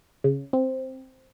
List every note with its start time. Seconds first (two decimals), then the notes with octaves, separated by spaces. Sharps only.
0.24 C#3
0.53 C4